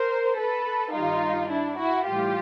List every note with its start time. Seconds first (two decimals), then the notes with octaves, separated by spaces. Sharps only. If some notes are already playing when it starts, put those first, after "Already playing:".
Already playing: A#4 C5
0.37 A4 B4
0.93 G2 D#3 G3 D#4 F4
1.50 D4 E4
1.79 E4 F#4
2.06 A2 E3 G3 F4 G4